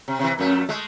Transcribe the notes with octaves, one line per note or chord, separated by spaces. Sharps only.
C3
C3 E3
F2 A3
G#3 A3